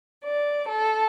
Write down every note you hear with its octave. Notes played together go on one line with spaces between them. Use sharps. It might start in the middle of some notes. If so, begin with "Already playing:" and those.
D5
A4